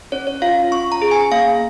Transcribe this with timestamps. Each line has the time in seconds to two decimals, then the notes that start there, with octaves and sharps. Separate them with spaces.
0.12 C#4 C#5
0.27 C#5
0.42 F4 F5
0.72 C#4 C#6
0.92 A#5
1.02 G#4
1.11 G#5
1.31 A#3 F5